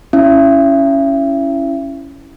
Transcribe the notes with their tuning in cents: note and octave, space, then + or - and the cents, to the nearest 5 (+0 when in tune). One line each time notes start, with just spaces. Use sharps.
C#4 +0 E4 +0 E5 +40